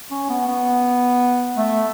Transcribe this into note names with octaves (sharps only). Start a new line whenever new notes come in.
C#4
B3
B3
A3